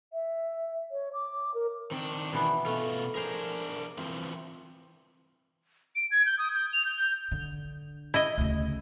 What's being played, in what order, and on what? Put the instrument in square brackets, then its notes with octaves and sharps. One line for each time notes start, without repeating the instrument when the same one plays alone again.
[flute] E5
C#5
D6
A#4
[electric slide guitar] D#3 D4 [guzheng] C4
[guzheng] B2 E3 B3
[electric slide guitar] B2 F4 [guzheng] A3
[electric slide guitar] D4 A#4 [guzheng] G#4 C5
[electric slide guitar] E3 C4 F4
[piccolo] D7
G#6
G6
D#6
G6
F7
G6
G6
[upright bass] D3
[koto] E4 D#5
[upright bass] D2 C#3